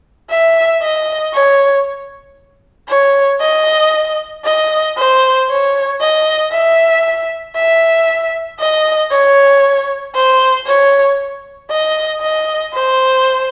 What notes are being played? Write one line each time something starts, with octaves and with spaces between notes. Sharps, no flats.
E5
D#5
C#5
C#5
D#5
D#5
C5
C#5
D#5
E5
E5
D#5
C#5
C5
C#5
D#5
D#5
C5